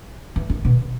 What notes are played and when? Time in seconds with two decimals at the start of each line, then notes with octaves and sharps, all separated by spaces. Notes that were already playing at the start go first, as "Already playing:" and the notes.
0.36 E3
0.50 D#3
0.65 B2